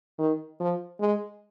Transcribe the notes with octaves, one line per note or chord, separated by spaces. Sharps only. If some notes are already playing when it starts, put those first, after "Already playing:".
D#3
F3
G#3